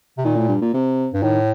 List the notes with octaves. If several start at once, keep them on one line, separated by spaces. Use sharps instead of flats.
C3
A#2 D#3
A2
G2
A#2
C3
G2
A2 D#3